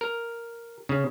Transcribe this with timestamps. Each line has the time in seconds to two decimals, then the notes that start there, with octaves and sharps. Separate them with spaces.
0.01 A#4
0.89 C#3